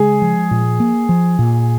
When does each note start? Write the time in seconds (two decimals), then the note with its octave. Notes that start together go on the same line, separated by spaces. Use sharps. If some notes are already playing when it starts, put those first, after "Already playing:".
Already playing: C#3 G#3 G#4
0.22 F3
0.51 A#2
0.80 A#3
1.09 F3
1.39 A#2